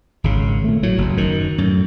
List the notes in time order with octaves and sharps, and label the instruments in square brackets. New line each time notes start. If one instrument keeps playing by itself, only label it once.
[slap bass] G#1 C#3
A#2 A3
A2 F#3
F#1 D2
F#2 D#3
F#2 A2